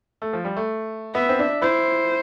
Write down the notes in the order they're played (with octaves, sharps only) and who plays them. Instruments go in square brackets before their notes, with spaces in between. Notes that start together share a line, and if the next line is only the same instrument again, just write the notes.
[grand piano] A3
F3
G3
A3
[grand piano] B3 [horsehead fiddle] E5
[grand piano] C4
D4
[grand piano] E4 [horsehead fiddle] C5